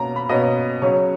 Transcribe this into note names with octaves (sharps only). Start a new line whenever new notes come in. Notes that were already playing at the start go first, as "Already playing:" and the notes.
Already playing: B2 A#3 C#4 A#5
B5
B2 A#3 C#4 D#5
C#3 F#3 C#4 C#5